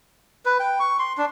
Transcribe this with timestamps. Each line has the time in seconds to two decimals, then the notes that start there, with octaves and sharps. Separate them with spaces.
0.45 B4
0.60 G5
0.80 C#6
0.99 C6
1.18 D4